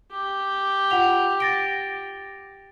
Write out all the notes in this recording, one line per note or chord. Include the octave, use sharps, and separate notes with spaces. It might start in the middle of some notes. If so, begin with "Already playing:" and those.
G4
F4 F#5 F7
A6 A#6 D7